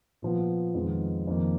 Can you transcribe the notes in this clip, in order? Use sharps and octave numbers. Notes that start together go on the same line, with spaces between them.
A#2 F3 B3
F2 D#3 G#3 B3
F2 D#3 A#3